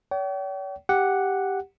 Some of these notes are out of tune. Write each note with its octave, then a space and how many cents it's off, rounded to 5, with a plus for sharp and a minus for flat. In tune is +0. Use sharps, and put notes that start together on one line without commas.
C#5 +45 G5 -40
G4 +0 F#5 +0